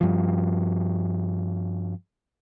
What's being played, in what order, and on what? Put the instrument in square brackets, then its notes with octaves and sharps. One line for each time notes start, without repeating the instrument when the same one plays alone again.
[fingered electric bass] G2 F3